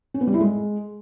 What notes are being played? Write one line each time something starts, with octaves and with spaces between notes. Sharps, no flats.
C#4
B3
G3
E4
G#3